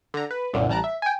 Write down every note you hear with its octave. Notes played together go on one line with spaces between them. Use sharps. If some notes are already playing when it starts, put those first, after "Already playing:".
D3 A#5
B4
C2 F#2 A#2 D3
A1 G3 A5 A#5 F#6 D7
E5
G5 G#5